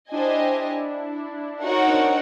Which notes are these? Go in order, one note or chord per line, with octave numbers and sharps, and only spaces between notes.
D4 E4 G4 C5 D#5 G#5
D#4 F#4 A#4 C#5 F#5
C4 D4